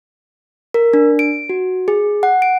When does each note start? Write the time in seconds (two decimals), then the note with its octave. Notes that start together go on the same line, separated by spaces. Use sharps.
0.74 A#4
0.94 D4
1.19 D7
1.49 F#4
1.88 G#4
2.23 F#5
2.42 D7